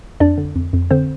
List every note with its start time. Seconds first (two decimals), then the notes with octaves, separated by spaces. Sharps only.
0.20 F2 D4 D5
0.38 D3
0.56 F2
0.73 F2
0.91 D3 C4 C5